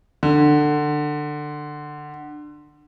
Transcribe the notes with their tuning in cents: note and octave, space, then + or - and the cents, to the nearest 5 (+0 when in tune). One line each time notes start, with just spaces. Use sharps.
D3 +20